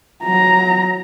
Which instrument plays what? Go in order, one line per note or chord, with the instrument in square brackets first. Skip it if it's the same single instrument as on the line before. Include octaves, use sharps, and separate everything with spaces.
[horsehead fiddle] F#3 A#5